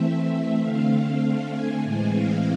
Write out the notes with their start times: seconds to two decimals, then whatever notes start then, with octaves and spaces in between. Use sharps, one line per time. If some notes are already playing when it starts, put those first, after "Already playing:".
Already playing: E3 A3 C4 E5
0.60 D3 A3 C4 F5
1.53 G#5
1.84 A2 E3 G#3 C4 G#5
2.15 F5